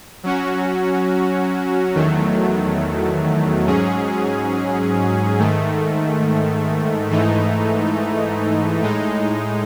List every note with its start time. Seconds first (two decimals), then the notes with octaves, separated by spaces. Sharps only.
0.23 F#3 C#4 F#4
1.95 E2 D#3 F#3 A3
3.67 G#2 F#3 C#4 G#4
5.38 G#2 D#3 A3
7.10 G#2 E3 A3 D#4
8.81 A2 G#3 D#4